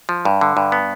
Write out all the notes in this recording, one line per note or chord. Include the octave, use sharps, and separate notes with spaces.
F3
G2
D3
G2
B3